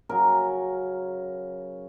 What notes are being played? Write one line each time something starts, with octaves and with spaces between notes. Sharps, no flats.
C#3 F#3 C#4 A#4